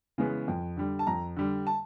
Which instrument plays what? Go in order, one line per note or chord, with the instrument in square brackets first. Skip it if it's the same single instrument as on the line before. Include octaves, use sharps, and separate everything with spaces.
[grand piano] C#3 E3 G#3 B3
F2
D3 G3
A5
F2 A#5
D3 G3
A5